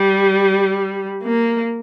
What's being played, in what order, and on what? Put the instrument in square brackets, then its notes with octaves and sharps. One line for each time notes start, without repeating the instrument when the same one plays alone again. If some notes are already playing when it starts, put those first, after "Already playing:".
Already playing: [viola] G3
A#3